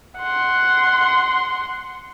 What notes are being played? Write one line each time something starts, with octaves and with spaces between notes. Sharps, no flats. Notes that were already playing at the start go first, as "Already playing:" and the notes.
F#5 C6